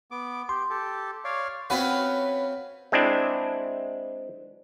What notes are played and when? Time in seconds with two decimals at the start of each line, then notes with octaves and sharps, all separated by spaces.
0.11 B3 D6
0.49 G4 C6
0.70 G4 A4
1.24 C#5 D5 F5
1.70 C4 C#4 F4 F#4 B4
2.92 G#3 C4 D4 E4